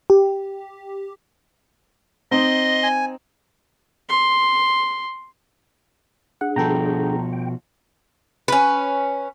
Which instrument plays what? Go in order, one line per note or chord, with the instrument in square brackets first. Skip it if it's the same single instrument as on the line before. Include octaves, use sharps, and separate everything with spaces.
[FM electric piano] G4
[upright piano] C4 D#4 [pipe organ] D#5 C6
[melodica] G#5
[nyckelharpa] C6
[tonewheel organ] D4 G#4 [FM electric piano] F#5
[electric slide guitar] B2 F3 F#4 [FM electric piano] A4 G5 A#5
[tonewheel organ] G5
[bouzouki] C#4 B4